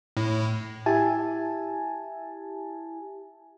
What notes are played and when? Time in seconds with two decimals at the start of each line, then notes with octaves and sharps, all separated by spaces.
0.17 A2
0.86 E4 G4 E5 G#5 A5